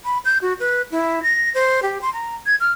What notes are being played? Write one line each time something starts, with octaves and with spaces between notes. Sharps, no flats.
B5
G6
F#4
B4
E4
A#6
C5
G4
C6
A#5
G#6
F6